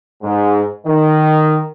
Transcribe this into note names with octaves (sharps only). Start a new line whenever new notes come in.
G#2
D#3